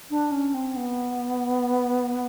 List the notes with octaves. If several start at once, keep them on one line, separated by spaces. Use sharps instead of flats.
D4
C#4
C4
B3